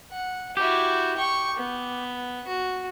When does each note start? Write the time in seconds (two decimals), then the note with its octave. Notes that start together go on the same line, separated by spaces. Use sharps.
0.11 F#5
0.57 E4 F#4 G4
1.17 G5 C#6
1.57 B3
2.47 F#4